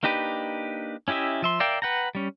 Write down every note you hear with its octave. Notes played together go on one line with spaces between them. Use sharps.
A#3 D4 D#4 G4 B4
C#4 E4 G4 D#5 E5
F3 E5 C6
A#4 D5 E5 F5 G5
B4 F#5 G5 A#5
G3 C#4